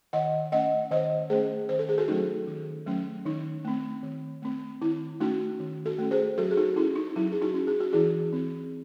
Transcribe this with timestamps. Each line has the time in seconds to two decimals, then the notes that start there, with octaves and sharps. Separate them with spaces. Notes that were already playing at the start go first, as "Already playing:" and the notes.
0.13 D#3 D#5 F#5
0.52 A3 C#4 D#5 F#5
0.91 D#3 C5 D#5
1.30 A3 C#4 G#4 C5
1.69 D#3 C5
1.79 A4
1.89 G#4
1.98 F#4 A4
2.08 F#3 A3 C#4 D#4
2.47 D#3
2.86 F#3 A3 C#4
3.25 D#3 D#4
3.65 A3 C4
4.03 D#3
4.42 A3 C4
4.81 D#3 E4
5.20 A3 C#4 D#4 F#4
5.60 D#3
5.86 F#4 A4
5.99 A3 C#4
6.11 G#4 C5
6.38 F#3 F#4 A4
6.51 G#4
6.57 D#4 F#4
6.76 C#4 E4
6.95 D#4
7.16 F#3 E4
7.32 G#4
7.42 D#4 F#4
7.54 C#4
7.67 G#4
7.80 F#4
7.93 E3 E4 G#4
8.33 C4